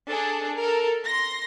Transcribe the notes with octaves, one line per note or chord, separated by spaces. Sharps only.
D4 G#4 A4
A4 A#4
C6 A#6